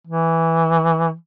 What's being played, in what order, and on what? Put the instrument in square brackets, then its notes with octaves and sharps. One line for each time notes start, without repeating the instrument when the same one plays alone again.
[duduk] E3